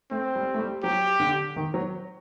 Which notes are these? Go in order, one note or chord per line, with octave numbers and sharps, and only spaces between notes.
A3 C4
G3
A3
G3
F#3 G4
D3
D#3
F#3